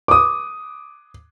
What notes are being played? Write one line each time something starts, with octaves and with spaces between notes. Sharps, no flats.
D6 D#6